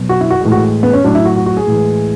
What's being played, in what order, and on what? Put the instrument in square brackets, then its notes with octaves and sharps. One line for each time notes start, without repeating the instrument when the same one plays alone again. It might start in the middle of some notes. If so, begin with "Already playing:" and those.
Already playing: [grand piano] B2 F#3
F#4
E4
F#4
A2 E3 G#3
F#4
B3
C#4
A2 F#3 D4
E4
F#4
F#4
F#4
G#4
A2 E3 G#3